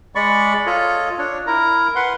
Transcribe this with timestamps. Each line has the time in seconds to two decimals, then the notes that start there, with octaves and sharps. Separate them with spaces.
0.15 G#3 D5 B5 C#6
0.66 F4 A4 C#5 D#5
1.18 D4 C#5
1.47 E4 A#4 A#5
1.95 B4 F#5 C6